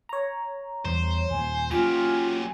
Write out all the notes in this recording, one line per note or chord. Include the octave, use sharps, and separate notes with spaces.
C#5 A#5
E2 G3 C5
D#2 A#2 G#5
F#3 A#3 C#4 F4 G4 G#5